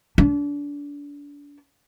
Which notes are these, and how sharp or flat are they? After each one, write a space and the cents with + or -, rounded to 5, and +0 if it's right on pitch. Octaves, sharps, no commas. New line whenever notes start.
D4 -30